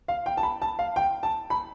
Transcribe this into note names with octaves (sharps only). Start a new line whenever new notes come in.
F5
G5
A5
B5
A5
F5
G5
A5
B5